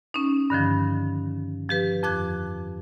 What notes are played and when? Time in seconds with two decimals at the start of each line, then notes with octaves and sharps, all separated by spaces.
0.14 C#4 D#4
0.50 G2 D3 D#3 F3
1.69 F3 G4 B4
2.03 F2 F3 D6 F#6 G#6